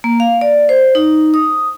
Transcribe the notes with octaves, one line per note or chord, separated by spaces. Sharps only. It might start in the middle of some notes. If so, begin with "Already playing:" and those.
A#3
F5
D5
C5
D#4
D#6